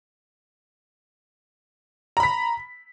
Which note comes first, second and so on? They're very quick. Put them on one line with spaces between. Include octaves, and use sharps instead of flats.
A#5 B5 B6